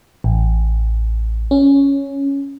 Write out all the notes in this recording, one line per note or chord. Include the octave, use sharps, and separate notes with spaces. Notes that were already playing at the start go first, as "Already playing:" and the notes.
A1
C#4